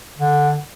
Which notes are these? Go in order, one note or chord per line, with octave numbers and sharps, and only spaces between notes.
D3